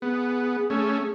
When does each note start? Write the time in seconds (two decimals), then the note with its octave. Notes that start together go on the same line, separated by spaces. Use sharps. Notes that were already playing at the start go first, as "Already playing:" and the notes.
0.02 B3 G#4
0.70 A3 C#4